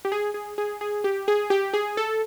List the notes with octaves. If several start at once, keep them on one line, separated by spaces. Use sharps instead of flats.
G4
G#4
G#4
G#4
G#4
G4
G#4
G4
G#4
A4